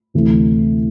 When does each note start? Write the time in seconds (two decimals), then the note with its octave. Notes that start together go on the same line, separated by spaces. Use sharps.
0.14 D2 C3 E3 A3